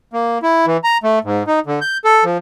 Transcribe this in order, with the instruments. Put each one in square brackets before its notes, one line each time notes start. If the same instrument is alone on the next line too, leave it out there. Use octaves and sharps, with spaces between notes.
[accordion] A#3
E4
E3
A#5
A3
G#2
D#4
D3
G6
A4
F3